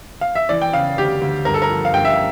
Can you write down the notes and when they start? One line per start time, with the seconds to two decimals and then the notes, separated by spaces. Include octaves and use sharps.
0.21 F5
0.35 E5
0.49 E3 D5
0.62 G5
0.73 C#3 F5
0.97 D2 G4
1.21 D2
1.45 G2 A#4
1.54 A4
1.62 A#4
1.70 F3
1.85 F5
1.93 G2 G5
2.05 E5
2.10 F5